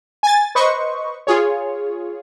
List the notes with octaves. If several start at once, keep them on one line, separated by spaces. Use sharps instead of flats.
G#5 A6
B4 C5 D#5 C#6
F4 G#4 C#5